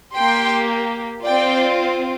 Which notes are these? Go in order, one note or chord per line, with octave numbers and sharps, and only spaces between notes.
A#3 G4 G5 C6
C4 F4 D5 G5